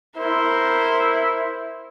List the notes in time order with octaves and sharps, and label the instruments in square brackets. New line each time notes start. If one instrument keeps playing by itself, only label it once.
[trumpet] E4 [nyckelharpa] A#4 C5